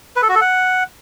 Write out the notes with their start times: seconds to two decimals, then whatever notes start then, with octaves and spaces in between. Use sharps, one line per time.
0.16 B4
0.22 A4
0.29 F#4
0.35 A4
0.41 F#5